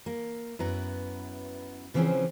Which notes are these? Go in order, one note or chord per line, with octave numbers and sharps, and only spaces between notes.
A#3
F#2 B3 E4 B4 A#5
C#3 E3 F3 C4 C#4 G#4